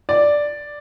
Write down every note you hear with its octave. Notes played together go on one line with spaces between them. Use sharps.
D5